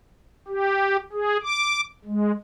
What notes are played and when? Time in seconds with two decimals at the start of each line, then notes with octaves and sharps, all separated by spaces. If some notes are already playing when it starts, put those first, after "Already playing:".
0.48 G4
1.13 G#4
1.43 D6
2.05 G#3